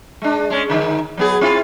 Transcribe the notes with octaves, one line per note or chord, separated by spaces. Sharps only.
G#3 D4
G#3 C#4
G#2 D3 D#3
F#3 B3 G#4
C4 E4 F4